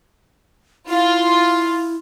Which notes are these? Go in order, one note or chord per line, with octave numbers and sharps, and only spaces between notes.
E4 F4